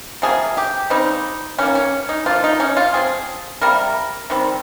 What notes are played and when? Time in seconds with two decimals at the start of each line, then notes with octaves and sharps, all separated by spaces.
0.22 C3 F3 A#3 G#4
0.57 G4
0.90 C#3 G3 C4 D#4
1.58 D#3 A#3 C#4
1.75 C#4
2.09 D#4
2.26 F3 A#3 F4
2.44 D#4
2.60 C#4
2.77 F4
2.94 F3 C4 G#4
3.61 C3 G3 A#3 A#4
4.30 D#3 G3 C4